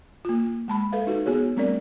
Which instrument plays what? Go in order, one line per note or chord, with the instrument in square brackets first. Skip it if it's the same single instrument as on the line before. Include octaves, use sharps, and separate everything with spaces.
[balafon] A#3 F4
G#3 A5 B5
A4 B4 E5 F5
D#4 F#4 A4
B3 F#4 G#4 C#5
G3 A3 C4 D4 A#4 D5